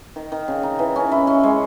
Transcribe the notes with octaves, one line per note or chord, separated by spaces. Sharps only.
D#3
D#3
C#3
D#4
E3
C#4
E4
C#4
G#3